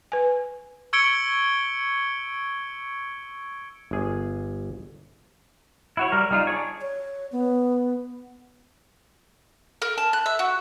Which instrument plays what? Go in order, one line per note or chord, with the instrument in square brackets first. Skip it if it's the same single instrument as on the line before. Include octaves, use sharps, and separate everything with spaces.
[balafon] B4 G#5
[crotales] C#6 E6 G#6 C#7 D7 G7
[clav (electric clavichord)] G1 G#4
[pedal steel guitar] E4 F#4 C#5
G3 A#4
G3 D#4 F4
D4 G#4 C#5
[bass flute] C#5
B3
[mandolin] A#4
A5
F#6
E5
F#4